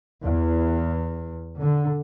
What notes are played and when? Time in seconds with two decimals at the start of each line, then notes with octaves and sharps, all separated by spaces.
0.21 E2
1.58 D3